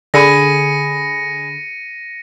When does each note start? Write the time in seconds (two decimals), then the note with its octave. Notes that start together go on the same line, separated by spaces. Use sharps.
0.14 D3 G#4 B5 A#6 C#7 D#7